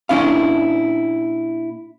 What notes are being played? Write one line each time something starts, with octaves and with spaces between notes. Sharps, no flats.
A#2 G#3 C#4 D4 E4 F5